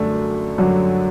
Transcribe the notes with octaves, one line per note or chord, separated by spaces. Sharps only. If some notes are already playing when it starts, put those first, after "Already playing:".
Already playing: F#2 D3 G3 A3 D4
F#2 D3 F#3 G3 D4